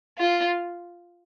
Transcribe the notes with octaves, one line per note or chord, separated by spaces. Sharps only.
F4